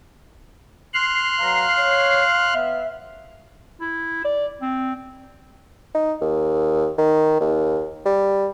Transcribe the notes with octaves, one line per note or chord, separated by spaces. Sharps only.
C6 F6 F#6 C7
F#3 B4 F5 A#5
C#5
B3 E5
E4
D5
C4
D#4
D#2
D#3
D#2
G3